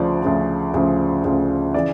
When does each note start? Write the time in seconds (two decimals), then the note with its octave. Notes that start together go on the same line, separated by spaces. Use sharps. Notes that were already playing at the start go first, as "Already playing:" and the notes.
Already playing: D2 C#3 F3 D5
0.23 D2 C#3 F3
0.74 D2 C#3 F3
1.24 D2 C#3 F3
1.74 C#3 E3 D5